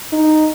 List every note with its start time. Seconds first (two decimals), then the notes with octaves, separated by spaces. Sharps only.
0.12 D#4